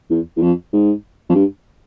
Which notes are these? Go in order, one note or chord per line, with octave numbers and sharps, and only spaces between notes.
E2
E2
F2
G#2
F2
G2